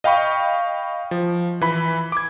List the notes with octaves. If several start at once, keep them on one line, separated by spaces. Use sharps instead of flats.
D#5 F5 G5 B5 C#6
F3
E3 B5
D6 G#6